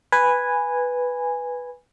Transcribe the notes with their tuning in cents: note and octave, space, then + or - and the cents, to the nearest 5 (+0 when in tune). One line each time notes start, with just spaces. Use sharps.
B4 +0 G#5 -10